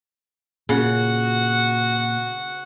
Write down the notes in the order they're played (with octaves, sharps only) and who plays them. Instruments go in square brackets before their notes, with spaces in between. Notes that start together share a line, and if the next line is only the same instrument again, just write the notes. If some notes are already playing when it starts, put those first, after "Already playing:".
[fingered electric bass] A#2 [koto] C#3 [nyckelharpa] F#4 F#5